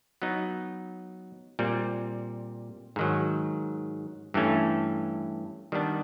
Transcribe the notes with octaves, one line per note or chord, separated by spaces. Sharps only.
F#3 B3 D#4
A#2 G3 C4
G#2 D#3 F#3
G2 E3 A3 C#4
D#3 G3 B3 D4